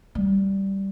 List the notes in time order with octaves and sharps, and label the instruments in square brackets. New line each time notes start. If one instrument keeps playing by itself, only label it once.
[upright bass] G3